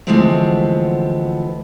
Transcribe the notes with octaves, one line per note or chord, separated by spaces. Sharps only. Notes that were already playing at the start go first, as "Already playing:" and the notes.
D2 E3 F3 G#3 B3 C4